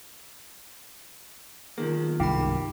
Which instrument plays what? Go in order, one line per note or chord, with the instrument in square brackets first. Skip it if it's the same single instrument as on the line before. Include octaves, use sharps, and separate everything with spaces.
[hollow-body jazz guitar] B1 D#3 A#3 [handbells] F4 G#4
[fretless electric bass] C2 G2 B2 [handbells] D#4 E4 B5 [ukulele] G4